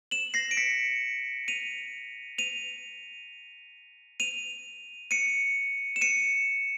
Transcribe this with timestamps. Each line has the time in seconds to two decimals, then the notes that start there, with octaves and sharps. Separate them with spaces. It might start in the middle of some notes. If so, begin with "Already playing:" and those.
0.11 E7 F#7
0.34 A#6 C7
0.51 D7
0.57 B6 C#7
1.48 D#7 F7
2.38 D#7 F7
4.20 D#7 F7
5.11 C#7 D#7
5.96 E7
6.01 C#7 D#7